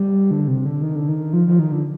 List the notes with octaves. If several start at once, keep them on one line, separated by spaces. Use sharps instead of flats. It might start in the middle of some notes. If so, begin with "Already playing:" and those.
Already playing: G3
D3
C3
D3
D#3
D3
D#3
F3
F3
D#3
D3